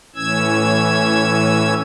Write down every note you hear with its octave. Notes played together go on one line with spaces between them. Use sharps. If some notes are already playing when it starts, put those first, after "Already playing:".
A2 E3 C#4 E6 G#6